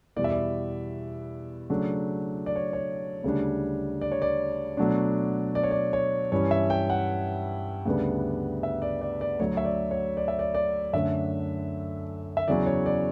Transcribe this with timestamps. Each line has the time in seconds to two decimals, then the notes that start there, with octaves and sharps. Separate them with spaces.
0.16 E2 B2 G3 D5
0.24 E5
0.31 D5
1.70 C#3 F#3 A3 D4
2.46 D5
2.56 C#5
2.73 C#5
3.24 D2 C#3 G3 D4
4.01 D5
4.12 C#5
4.22 D5
4.77 B2 F#3 A3 D4
5.55 D5
5.63 C#5
5.71 D5
5.93 C#5
6.32 G2 E3 G3 C#4 C#5
6.51 E5
6.70 G5
6.90 F#5
7.85 D2 C#3 G3 B3 D4
8.63 E5
8.82 D5
9.01 D5
9.21 D5
9.40 D2 D3 F#3 C#5
9.57 E5
9.65 D5
9.91 C#5
10.17 D5
10.28 E5
10.39 D5
10.55 D5
10.93 F#2 D3 A3 D4 E5
12.37 E5
12.48 E2 C#3 F#3 C#4 D5
12.66 C#5
12.86 D5